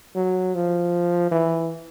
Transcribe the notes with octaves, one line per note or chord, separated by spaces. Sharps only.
F#3
F3
E3